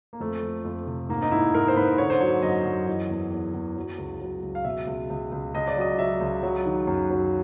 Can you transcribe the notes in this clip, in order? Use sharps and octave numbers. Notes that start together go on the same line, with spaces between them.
A#3
F2 A3
F3
F2
C3
G#2 A#3
D#4
G#2 E4
G#2 A#4
C5
G#2 B4
D3 C#5
C5
F#3 C#5
F#2 D#5
F#2
E3 D#5
E2
E2
E2
F#3
C#2
F#3
C#2
F5
B2 E5
C#2
C#2
C#2
C#2 D#5
D5
F#3 D#5
F#3 E5
C#2
F#3
D#3
F#2
F#3